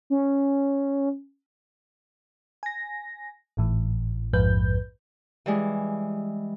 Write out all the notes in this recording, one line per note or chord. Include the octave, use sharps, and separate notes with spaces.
C#4
G#5 A#6
G#1 A2 E3
A#1 F2 G#2 F3 B4 G6
E3 G3 G#3